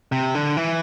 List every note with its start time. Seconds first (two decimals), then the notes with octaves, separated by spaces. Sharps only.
0.12 C3
0.35 D3
0.57 E3